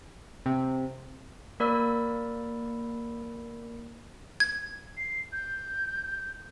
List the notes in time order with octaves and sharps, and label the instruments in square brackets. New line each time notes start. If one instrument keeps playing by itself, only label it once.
[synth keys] C3
[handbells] A#3 A#4 D5 B5 E6
[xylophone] G#6
[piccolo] C7
G6